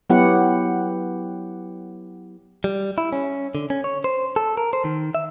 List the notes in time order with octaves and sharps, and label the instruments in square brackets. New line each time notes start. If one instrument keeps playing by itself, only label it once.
[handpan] F#3 B3 E4 G4 F#5
[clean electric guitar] G3
E4
C#4
D3
C#4
C#5
C5
A4
A#4
C5
D#3
E5